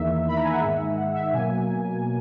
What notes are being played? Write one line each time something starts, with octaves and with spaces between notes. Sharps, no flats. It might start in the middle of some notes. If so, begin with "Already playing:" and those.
Already playing: E2 D#3 A#3 E5
B5
A#5
G#5
F#5
G#2 D#3 G#3 E5
E5
F#5
E5
B2 F#3 A#3 G#5